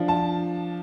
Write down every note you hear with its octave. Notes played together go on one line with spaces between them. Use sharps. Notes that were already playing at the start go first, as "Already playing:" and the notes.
Already playing: F3 D4 F4
A5